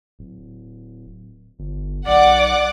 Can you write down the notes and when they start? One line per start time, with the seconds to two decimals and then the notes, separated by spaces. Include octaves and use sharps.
0.19 D1
1.59 G1
2.07 B1 D5 F#5 D6